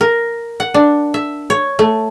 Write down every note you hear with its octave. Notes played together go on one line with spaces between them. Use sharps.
A#4
F#5
D4
E5
C#5
A3